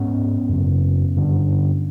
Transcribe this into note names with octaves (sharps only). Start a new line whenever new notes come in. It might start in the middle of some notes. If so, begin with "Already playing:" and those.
Already playing: G#2 B3 C#4
F#2 C#3
G2 D3